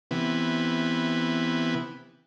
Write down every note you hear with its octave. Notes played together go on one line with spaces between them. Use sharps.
C3 E3 B3